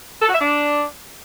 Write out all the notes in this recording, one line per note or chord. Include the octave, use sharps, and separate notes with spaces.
A4
F#4
E5
D4